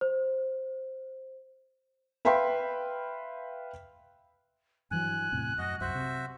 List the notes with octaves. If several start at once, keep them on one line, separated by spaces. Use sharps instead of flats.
C5
B4 E5 F5 G5 B5 C6
G2 E3 F#3 G#5 F#6
E2 A2 C3
F#2 F#4 D#5
C2 F#2 F#4 C5 E5
C3